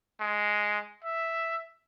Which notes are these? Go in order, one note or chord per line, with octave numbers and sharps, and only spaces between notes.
G#3
E5